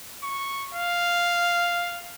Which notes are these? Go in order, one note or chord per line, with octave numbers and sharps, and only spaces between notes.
C#6
F5